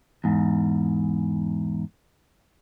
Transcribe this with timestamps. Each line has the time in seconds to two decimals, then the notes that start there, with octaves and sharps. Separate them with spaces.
0.24 E2 G#2